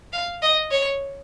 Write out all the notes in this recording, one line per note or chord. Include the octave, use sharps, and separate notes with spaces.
F5
D#5
C#5